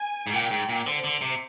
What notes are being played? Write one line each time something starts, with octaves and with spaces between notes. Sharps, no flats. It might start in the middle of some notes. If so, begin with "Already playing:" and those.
Already playing: G#5
G#2
A#2 G5
G#2
A#2
D3 C5
D3
C3